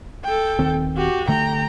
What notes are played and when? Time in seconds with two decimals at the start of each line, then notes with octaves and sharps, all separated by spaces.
0.24 A4 G5
0.59 D#1 D#3 C4
0.97 F#4 G4
1.28 D3 A3 G5 A#5